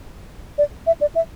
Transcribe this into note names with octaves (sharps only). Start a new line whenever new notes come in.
D5
E5
D5
E5